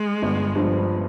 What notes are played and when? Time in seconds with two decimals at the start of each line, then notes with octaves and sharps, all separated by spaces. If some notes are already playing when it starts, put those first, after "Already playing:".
Already playing: G#3
0.22 G1
0.55 G2 F3